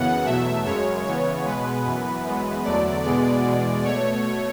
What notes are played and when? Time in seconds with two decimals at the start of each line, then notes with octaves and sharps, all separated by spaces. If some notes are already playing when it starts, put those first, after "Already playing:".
Already playing: F#2 C#3 E3 B3 F#5
0.25 E2 B2 F#3 A3 E5
0.65 F#2 C#3 G#3 C#5
1.05 C#3 E3 B3 C#5
1.45 B2 G#3 B3 B4
1.84 F#2 E3 B3
2.24 F#2 E3 G#3 B3
2.64 E2 D3 F#3 A3 D5
3.03 E2 B2 G#3 B3 D5
3.44 E2 B2 G#3
3.84 B2 A3 C#5